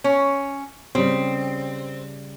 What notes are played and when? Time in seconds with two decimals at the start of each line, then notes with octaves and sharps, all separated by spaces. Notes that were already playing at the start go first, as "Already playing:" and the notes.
0.04 C#4
0.95 C#3 G3 C4